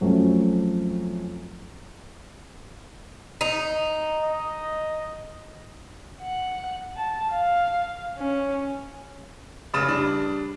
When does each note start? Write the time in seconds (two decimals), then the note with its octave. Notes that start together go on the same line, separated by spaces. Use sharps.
0.01 F2 F#3 A3 C#4
3.41 D#4
4.23 D#5
6.21 F#5
6.96 A5
7.31 F5
8.18 C#4
9.74 F1 C#3 B5 A6 E7
9.88 G3 D4